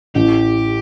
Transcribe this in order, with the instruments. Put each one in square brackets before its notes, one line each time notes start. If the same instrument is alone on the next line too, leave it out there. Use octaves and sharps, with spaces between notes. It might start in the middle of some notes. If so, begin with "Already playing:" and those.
[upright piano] A1 [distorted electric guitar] G4